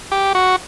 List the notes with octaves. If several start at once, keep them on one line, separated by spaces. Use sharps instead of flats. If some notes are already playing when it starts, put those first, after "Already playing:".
G4
F#4